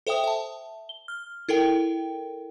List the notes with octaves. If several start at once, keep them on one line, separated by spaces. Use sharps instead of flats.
A4 C5 E5 G5 D#6
E5 A5
G7
F6
E4 A4 A#4 G5